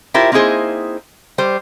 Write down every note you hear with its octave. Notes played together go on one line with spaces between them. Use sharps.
E4 F4 G4 A#4 C5 E5
A#3 C4 D#4 E4 G#4 C5
G3 C5